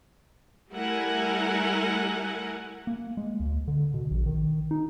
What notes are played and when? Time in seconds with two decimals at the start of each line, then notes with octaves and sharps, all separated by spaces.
0.73 G3 A3 E4 A#4 F#5 G#5
2.87 A#3
3.17 G#3
3.40 D2
3.68 D3
3.94 B2
4.11 A#1
4.26 D#3
4.71 D#4